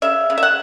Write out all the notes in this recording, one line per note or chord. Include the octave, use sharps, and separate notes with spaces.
C#3 E5
C#3
E5
F#5